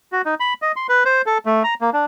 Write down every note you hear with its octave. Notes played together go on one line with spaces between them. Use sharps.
F#4
D#4
B5
D#5
C6
B4
C5
A4
A3
A#5
A#3
D4